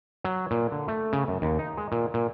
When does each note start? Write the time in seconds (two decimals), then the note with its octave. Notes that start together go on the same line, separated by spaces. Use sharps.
0.24 F#3
0.51 A#2
0.72 D3
0.88 A3
1.13 C#3
1.28 F#2
1.42 D#2
1.59 D#4
1.77 G#3
1.92 A#2
2.14 A#2